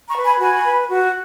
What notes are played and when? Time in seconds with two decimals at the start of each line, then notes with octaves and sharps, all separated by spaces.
0.09 A#5 C#6
0.18 B4
0.25 G#5 B5
0.40 F#4 G#5 B5
0.65 B4
0.89 F#4